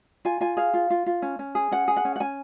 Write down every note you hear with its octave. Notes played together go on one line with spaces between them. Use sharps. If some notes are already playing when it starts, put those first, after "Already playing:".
F4 G#5
F4 G#5
G#4 F5
F4
F4
F4
C#4
C#4
G#4
C#4 F#5
G#4
F#5
C#4
F#5
C#4 G#5